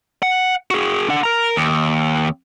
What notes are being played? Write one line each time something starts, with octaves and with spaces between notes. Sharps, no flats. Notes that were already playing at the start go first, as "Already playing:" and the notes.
F#5
F#4 G#4
D4 F#5
A#4 A#5
D#2